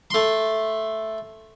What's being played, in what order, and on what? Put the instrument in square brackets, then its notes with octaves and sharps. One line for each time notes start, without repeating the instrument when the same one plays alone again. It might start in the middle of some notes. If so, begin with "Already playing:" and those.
[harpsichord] A3 C6